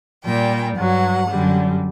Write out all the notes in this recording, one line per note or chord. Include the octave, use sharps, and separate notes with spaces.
A#2 G3 G5
G2 F#3 F#5
F#2 D3 G3